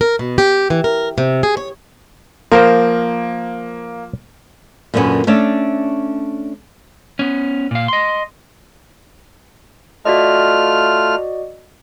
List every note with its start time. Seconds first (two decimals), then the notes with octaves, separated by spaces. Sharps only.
0.01 A#4
0.19 B2
0.38 G4
0.70 E3
0.84 A#4
1.18 C3
1.43 G#4
1.57 C#5
2.52 F3 A#3 A#4 C5
4.94 F#2 A#2 D3 G3 B3 C#4
5.27 A3 C#4 D4 C#5 D5 E5
7.19 B3 C#4
7.71 A#2 F5
7.88 D#5 C6
10.05 A3 F4 F#4 D5 D#5 F6